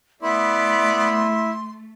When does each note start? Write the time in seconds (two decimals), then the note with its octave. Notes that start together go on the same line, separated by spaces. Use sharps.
0.22 A3 B3 E4 D5 C6